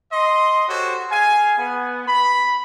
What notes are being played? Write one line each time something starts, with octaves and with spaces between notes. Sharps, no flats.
D#5 C6
F#4 G4 A4 C5 C#5
G#4 F5 G#5
B3
B5